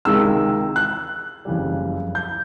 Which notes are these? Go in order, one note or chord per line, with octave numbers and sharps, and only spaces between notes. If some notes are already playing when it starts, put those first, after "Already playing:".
C#2 C3 D#3 G#3 E6
F#6
F#1 F2 C#3 E3 G3
G6